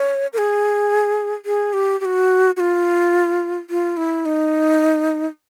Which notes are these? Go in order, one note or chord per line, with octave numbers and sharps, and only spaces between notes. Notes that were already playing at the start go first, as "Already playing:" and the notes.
Already playing: C#5
A#4
G#4
G#4
G4
G4
F#4
F#4
F4
F4
E4
D#4